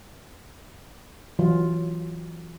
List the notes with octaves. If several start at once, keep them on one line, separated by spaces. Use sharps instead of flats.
E3 F#3 F4